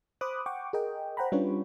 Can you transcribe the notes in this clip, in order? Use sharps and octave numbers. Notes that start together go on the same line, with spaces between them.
C5 B5 D6 D#6 F#6
F#5 G5 C#6 D6
G#4 A#4 D#5 G5
C5 F#5 G5 A#5 B5
G3 C#4 D4 F4 B4 C#5